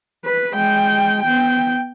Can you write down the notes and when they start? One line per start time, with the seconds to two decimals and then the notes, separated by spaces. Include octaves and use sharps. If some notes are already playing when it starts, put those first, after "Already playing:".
0.25 B4
0.54 G#3 G5
1.23 B3 G5